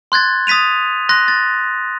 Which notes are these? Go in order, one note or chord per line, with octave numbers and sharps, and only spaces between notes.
C6 F#6 G#6 A6
D#6 A6 B6 D#7 F7
C6 F#6 A#6
A6